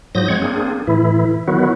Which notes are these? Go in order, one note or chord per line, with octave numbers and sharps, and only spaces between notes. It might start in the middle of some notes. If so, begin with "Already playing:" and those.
G#2 F3 F#3 D#6 G6 A#6
G#3 C4 C#5 F#5 G#6
A#3 C4 D4 G#4
A2 E3 E4
D#3 F#3 B3 E4 F#4